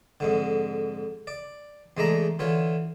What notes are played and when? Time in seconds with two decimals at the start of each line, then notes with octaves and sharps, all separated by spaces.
0.20 F2 G#2 D3
1.27 D5
1.97 E2 G#3 A3 D4 A#5
2.39 D3 E3 F4 C#5